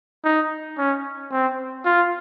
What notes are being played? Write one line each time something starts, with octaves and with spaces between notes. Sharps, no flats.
D#4
C#4
C4
F4